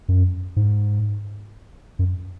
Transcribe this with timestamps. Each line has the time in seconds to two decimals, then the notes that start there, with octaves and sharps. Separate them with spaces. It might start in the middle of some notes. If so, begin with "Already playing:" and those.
0.09 F#2
0.56 G#2
1.99 F#2